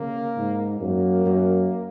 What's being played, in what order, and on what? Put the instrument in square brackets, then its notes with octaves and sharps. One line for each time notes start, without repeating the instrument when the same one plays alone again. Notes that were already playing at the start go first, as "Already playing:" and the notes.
Already playing: [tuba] C#3 [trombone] A#3
[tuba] G#2
[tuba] F#2 [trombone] A#3
[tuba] F#2